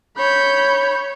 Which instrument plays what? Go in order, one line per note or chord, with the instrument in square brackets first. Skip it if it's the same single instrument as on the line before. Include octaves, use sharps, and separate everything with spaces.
[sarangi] C#5 [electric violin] B5 G6